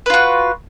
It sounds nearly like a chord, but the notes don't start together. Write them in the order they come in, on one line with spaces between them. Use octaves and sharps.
B4 F4 F#4